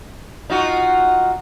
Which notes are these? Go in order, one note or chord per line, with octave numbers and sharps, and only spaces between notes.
D#4 F4 F#4